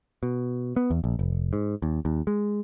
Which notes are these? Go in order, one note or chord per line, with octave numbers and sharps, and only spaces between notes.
B2
B3
E2
A#1
F1
G#2
D#2
D#2
G#3